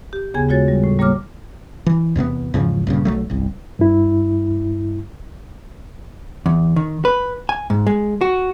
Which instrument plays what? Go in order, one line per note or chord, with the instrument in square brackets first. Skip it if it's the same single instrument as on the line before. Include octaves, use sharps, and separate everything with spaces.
[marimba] G4
D#2 C#3 B3 G#4 G#5 G#6
G#3 F4 F#4 C#5 A6
G3
A2
G3 A#3 C#5 D6 F6
[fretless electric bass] E3
E2 C3 A#3 B3
E2 G#2 C#3 F3
A#1 G2 C#3
B1 F#3 A3
G1 C2
[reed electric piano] G2 E4
[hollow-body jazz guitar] E2
D#3
B4
G#5
G#2
G#3
F#4